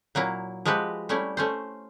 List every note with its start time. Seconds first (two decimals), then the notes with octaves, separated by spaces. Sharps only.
0.15 A#2 F#3 A#3 E4
0.65 F3 G#3 F#4 G4 B4
1.09 G3 A3 C#4 E4
1.37 A3 C#4 C5